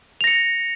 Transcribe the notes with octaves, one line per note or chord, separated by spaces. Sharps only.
A#6 C#7 F7